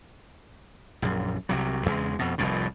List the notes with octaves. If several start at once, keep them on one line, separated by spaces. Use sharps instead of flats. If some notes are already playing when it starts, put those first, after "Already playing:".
A#1 F#2
C2 C3 F#3
E2 C#3 G#3
F2 B2
F1 C2 F2 A2